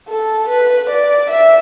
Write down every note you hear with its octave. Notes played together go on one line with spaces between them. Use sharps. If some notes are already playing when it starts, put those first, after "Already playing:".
A4
B4
D5
E5